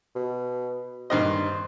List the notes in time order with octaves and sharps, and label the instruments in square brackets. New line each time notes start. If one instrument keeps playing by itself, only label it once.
[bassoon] B2
[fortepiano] G2 D#3 D#5 [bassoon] C5